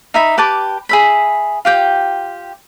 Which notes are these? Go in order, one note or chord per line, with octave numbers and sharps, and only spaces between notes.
D#4 E5 B5
G4 B4 A5 D6
G#4 E5 B5
F4 G4 G5